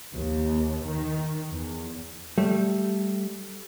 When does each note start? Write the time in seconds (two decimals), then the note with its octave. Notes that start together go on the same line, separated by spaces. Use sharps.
0.13 D#2
0.87 D#3
1.50 E2
2.38 G3 A3